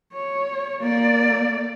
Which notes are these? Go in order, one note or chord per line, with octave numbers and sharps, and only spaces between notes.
C#5
A#3 D5